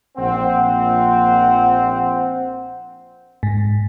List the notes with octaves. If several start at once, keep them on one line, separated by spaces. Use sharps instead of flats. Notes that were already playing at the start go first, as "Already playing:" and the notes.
A#1 C4 F#5
G#2